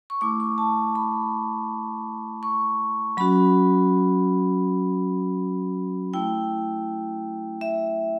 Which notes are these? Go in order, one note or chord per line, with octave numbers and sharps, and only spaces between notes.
C#6
A3 E4 D6
C#6
A5
B5
C#6
F#3 C#4 F#4 B5
A3 E4 G5
E5